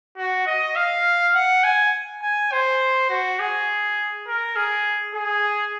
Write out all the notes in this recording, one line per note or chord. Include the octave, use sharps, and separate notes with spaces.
F#4
D#5
F5
F#5
G#5
G#5
C5
F#4
G#4
A#4
G#4
G#4